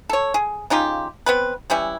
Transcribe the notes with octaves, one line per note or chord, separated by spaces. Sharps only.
A4 C#5
G#4
C#3 D#4 F4 G4
B3 C4 B4
E3 G3 C#4 E4